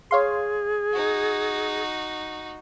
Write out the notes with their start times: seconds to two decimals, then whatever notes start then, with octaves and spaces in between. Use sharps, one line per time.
0.11 G#4 C#5 F5 C6
0.93 D#4 F#4